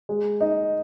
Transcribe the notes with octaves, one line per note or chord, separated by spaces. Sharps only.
G#3
D#4